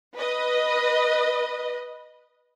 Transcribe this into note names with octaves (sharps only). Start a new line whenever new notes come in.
B4 D#5